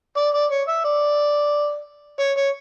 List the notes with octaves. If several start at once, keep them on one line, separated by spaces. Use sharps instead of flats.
D5
D5
C#5
E5
D5
C#5
C#5